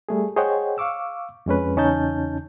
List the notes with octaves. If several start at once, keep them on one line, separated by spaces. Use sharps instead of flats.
G3 A3 G#4
G#4 C5 C#5 D#5 F#5 G5
F5 C#6 D6 E6
F2 G#3 C#4 B4
E2 C#3 C#4 D#4 A5 G6